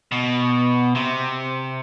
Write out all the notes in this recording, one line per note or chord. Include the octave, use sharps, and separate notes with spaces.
B2
C3